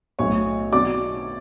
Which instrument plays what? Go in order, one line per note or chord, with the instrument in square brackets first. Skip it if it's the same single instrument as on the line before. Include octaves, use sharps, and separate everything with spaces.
[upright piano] B1 A2 F#3 [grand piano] C#5 C#6
[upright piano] B2 F#3 [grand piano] D5 D6